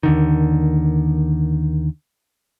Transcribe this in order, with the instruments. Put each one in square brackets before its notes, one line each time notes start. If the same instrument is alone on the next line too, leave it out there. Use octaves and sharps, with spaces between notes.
[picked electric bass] D#2 D3 D#3